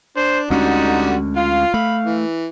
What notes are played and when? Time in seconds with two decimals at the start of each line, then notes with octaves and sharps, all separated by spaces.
0.16 D4 C5
0.50 D2 D3 G3 G#3 C#4 D#4 F#4
1.37 F4 F5
1.74 A3 B5
2.05 E3